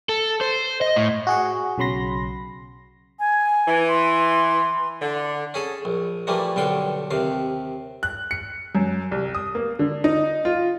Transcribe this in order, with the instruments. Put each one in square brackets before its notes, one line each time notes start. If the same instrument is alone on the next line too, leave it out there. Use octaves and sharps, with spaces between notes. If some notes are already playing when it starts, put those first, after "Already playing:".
[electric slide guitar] A4
C5
D#5
A2
[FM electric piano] F#4 G#4 F#5
B1 C#3 F#3 B5 C6 A#6
[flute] G#5
[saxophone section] E3
[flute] C6
[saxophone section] D3
[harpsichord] C#4 G#4 A4
A#1
E3 F3 G3 A3 A#3
B1 G2 D3 F5 G5 C#6
D#2 C3 F5
[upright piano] F#6
C#7
F#2
C2
D#6
A#3
D3
D#4
F4